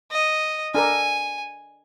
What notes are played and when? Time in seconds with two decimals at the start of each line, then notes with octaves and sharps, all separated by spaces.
0.11 D#5
0.74 D4 A4 A#4 G#5